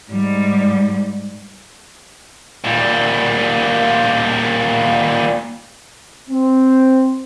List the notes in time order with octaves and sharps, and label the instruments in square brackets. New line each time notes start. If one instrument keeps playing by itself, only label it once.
[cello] G#2 G3
[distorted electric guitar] A#2 G3
[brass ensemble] C4